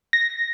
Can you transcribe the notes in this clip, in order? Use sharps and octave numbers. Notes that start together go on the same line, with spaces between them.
A#6